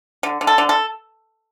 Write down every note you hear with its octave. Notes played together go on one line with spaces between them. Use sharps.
D3
D3
A4
D3
A4